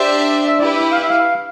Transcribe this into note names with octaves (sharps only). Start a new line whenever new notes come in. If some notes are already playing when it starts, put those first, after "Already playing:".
Already playing: D4 G4 C5 E5
E5
E4 G4 B4 D5
E5
F5
E5
F5